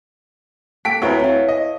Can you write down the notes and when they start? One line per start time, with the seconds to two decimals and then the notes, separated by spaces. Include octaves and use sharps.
0.85 A#3 A4 G5 B6 D7
1.02 D2 C4 E4 B4 C#5 E5 A#5
1.24 E4 F5
1.48 D#5